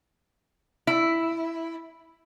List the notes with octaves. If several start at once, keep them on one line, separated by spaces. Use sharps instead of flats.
E4